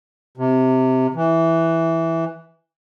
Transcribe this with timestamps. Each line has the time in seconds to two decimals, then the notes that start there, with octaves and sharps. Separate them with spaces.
0.37 C3
1.14 E3